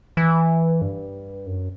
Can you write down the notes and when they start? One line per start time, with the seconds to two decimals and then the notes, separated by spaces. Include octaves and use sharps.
0.17 E3
0.82 G2
1.46 F#2